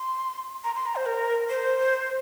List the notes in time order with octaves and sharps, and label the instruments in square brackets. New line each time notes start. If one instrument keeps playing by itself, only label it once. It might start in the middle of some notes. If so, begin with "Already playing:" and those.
Already playing: [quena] C6
A#5
C6
A#5
C5
A#4
C5